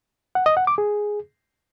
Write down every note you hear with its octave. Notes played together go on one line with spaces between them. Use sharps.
F#5
D#5
F#5
D6
G#4